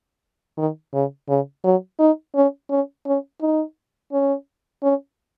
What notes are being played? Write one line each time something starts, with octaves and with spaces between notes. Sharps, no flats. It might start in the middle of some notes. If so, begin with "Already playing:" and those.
D#3
C#3
C#3
F#3
D#4
C#4
C#4
C#4
D#4
C#4
C#4